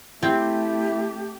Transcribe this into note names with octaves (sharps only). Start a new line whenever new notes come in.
A3 C4 E4 G4